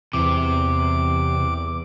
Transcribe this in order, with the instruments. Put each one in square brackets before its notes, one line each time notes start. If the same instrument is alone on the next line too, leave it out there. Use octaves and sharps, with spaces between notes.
[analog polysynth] E2 [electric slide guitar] C3 [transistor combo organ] D6